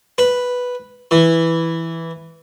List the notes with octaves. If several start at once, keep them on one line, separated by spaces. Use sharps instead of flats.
B4
E3